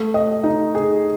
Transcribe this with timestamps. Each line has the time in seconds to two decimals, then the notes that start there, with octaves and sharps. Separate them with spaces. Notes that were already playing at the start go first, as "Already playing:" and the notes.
Already playing: A3
0.14 D#5
0.44 D#4
0.75 G#4